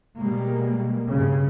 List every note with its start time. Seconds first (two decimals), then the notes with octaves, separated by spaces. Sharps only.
0.19 B2 G3 G#3 A#3
1.09 G2 C#3